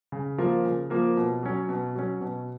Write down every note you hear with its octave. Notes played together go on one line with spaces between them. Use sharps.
C#3
F3 A#3 F4 A#4
C#3
F3 A#3 F4 A#4
B2
F#3 C#4
B2
F#3 C#4
B2